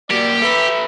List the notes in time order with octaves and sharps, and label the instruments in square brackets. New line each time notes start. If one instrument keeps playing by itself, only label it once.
[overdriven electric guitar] A#3 F#4 [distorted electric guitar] G4 [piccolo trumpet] D5
[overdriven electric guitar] A4 B4 [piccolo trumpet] E5